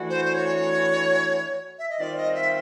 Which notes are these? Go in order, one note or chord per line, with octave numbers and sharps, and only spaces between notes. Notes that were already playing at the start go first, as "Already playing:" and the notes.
Already playing: E3 A3 D4 F#4
C5
C5
C#5
E5
D#5
D#3 G3 C4 F4 D5
D#5
E5